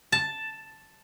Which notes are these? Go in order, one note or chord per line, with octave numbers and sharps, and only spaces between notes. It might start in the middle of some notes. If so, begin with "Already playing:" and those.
A5